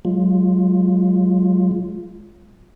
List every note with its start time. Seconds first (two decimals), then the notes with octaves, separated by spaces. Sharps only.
0.05 F#3 G#3 F4